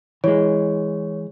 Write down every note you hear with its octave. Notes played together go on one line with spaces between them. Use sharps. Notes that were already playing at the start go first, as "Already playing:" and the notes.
E3 G#3 C#5